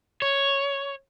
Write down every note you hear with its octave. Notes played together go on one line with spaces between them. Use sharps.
C#5